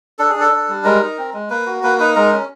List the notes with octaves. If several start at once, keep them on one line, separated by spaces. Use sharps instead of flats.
D4 A4
G#4
D4
A4
D4
G3
G#3 A#4
D#4
C4
G#3
A#3 B4
F#4
A#3 B4
D#4 B4
G#3 A#4
C#4